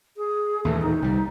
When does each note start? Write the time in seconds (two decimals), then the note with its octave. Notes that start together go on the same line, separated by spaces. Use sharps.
0.17 G#4
0.65 D#2 A#2 E3 A3
0.82 D#4
1.02 C2 G3